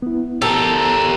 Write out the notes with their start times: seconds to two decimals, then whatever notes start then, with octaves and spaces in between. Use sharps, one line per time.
0.02 B3 E4
0.42 G4 A4 A#4